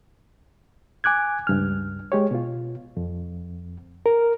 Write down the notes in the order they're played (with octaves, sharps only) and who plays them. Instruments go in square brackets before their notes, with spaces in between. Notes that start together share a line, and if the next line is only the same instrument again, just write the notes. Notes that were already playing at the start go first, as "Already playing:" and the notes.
[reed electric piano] G#5 D6 F#6 G#6
C#2 G2 F6
G#3 G4 C#5
B2 F4
F2
A#4